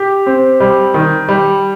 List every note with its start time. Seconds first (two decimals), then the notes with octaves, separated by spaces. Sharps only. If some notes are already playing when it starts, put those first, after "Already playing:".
Already playing: G4
0.26 C4
0.60 G3
0.94 D#3
1.29 G3